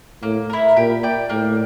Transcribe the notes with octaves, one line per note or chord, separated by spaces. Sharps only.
A2 A#3
E4 A#4
A#2 G4
D5 G5
A2 A#3